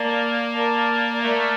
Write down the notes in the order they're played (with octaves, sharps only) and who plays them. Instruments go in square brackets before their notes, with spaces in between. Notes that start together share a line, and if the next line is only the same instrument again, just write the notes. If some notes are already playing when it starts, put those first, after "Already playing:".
Already playing: [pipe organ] A#3 [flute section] A#4 D5 A5
[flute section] A#4 D5 A5
[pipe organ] A3 [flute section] A#4 D5 A5